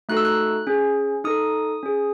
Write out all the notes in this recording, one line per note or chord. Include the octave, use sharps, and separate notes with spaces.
A3 D#4 F#4 A4 F#6
E6
F#6
C#4 G#4
D#4 A4 D#6
C#4 G#4